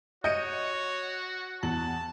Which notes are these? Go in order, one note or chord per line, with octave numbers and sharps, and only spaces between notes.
F#4 C#5 D#5 G6 C#7 D#7
E2 A5 F#7